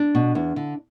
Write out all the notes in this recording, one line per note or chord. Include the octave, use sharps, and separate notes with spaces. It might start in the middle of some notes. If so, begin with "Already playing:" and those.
Already playing: D4
B2
E2
D3